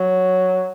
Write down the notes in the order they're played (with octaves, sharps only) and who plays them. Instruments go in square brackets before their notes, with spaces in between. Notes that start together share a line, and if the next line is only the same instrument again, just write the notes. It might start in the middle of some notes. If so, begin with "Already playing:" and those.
Already playing: [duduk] F#3